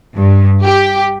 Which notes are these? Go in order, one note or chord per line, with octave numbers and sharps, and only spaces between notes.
G2
G4